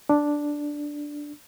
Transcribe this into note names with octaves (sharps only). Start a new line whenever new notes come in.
D4